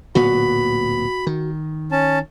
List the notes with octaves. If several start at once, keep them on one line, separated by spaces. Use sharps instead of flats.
D1 A#2 B3 F#4 B5
D#3
C#4 A5